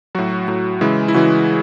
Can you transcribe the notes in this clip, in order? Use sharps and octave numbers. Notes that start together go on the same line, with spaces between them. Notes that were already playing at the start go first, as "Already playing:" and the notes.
A2 F#3 F#4
A2 F#3
C#3 E3 G#3 E4
E4
C#3 E3 G#3 F#4